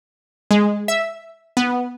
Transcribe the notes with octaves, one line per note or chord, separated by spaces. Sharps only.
G#3
E5
B3